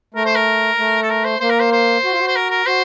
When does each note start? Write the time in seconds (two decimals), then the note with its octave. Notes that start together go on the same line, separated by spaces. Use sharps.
0.14 A3 A#4
0.25 C5
0.36 A#4
0.78 A3
1.03 A4
1.10 A#4
1.25 C5
1.40 A#3 C5
1.50 A#4
1.60 C5
1.72 C5
2.04 F#4
2.12 F4
2.20 F#4
2.27 C5
2.36 A#4
2.50 A#4
2.66 F#4 C5